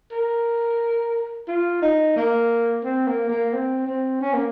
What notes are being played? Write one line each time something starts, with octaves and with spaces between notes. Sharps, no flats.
A#4
F4
D#4
A#3
C4
A#3
A#3
C4
C4
C#4
A#3